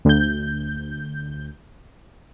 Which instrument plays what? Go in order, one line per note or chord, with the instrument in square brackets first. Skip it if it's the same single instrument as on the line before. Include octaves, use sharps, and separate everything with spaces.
[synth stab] D2 G6